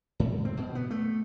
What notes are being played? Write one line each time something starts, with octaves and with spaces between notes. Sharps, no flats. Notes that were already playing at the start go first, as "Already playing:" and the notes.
G#2
C4
B2
B3
A3